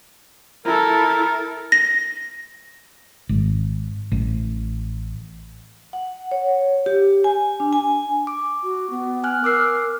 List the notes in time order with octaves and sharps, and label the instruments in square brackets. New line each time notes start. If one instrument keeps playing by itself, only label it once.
[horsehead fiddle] E4 A4 [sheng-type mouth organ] A#4
[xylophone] A#6
[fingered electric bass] G#1
A1
[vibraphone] F#5
C#5
G4
G#5
D4
G#5
[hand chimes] D6
[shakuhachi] F#4
B3
[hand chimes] G#5 F6 F#6
[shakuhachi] A#4 [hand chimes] D6 E6 C7